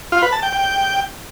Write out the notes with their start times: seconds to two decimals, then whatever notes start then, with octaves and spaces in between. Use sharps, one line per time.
0.12 F4
0.22 B4
0.32 A5
0.43 G5
0.53 G5